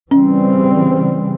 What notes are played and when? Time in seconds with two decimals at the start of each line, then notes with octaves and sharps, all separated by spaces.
0.11 C#3 E3 G3 C4 C#4